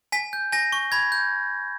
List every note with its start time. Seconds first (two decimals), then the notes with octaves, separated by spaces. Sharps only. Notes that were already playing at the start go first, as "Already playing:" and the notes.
0.12 G#5 B6
0.33 G6
0.52 G#5 A#6
0.72 C#6
0.92 B5 G#6
1.12 G6